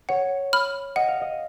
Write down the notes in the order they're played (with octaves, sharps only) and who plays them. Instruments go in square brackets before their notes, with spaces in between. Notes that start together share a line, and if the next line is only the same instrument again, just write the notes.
[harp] C#5 [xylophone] F#5
[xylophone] B5 F6
[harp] D#5 [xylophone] F#5
[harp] F5
D#5